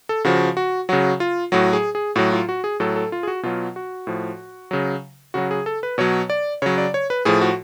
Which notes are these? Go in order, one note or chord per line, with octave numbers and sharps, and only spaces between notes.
A4
C#3 F3 F#4
F#4
C#3 F#3 F#4
F4
A2 F#3 F#4
G#4
G#4
A2 F#3 F#4
F4
F#4
G#4
A2 F#3 A4
A4
F4
G#4
F#4
B2 F#3 F4
F#4
A2 F3
C#3 F#3
C#3 F#3 F#4
G#4
A4
B4
B2 F#3 C#5
D5
C#3 F#3 C#5
D5
C#5
B4
A2 F3 G#4
F#4